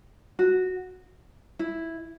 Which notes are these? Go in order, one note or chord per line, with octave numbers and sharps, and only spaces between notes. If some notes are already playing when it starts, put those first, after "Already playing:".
F#4
E4